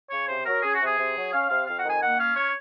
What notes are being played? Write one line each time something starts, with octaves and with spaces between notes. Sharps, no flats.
C#3 C#5
C3 C5
F#3 A#4
C#4 G#4
F#4
C3
G#4
C3
F#3
C#4 F5
C3 F5
F2 F5
F#5
D#3 G#5
A#3 F#5
C#4 F5
C#5